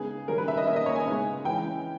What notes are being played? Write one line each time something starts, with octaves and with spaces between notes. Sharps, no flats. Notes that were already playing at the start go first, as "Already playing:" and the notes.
Already playing: C#3 G#3 B3 D#4 G#4
D#3 G3 C#4 A#4
B4
E5
D#5
D#3 A#3 C#4 E5
D#5
C#5
G#5
C#3 G#3 B3 D#4
E3 G#3 C#4 G5